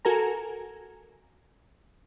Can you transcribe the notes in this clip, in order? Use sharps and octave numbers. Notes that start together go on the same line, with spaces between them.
F#4 A4 A#4 G#5 A#5